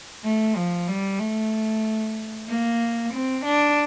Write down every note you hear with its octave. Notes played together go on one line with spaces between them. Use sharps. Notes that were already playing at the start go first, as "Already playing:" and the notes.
A3
F3
G3
A3
A#3
C4
D4